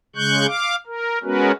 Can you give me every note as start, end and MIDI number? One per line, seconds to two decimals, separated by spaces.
0.16 0.46 49
0.16 0.46 56
0.16 0.46 85
0.16 0.46 90
0.16 0.46 91
0.46 0.76 77
0.46 0.76 86
0.87 1.19 70
1.23 1.52 56
1.23 1.52 59
1.23 1.52 61
1.23 1.52 66
1.23 1.52 70
1.23 1.52 71